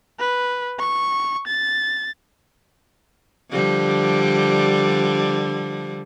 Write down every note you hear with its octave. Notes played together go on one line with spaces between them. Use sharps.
B4
C#6
A6
D3 F3 G3